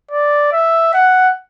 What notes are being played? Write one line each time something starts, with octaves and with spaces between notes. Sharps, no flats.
D5
E5
F#5